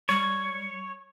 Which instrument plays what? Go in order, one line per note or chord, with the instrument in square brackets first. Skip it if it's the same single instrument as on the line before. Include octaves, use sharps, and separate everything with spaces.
[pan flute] G3 [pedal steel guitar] C#5